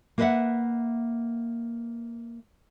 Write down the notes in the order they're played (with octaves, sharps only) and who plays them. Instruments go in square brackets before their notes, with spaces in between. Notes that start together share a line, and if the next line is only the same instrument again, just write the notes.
[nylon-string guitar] A#3 A#4 B4 D#5 E5 F#5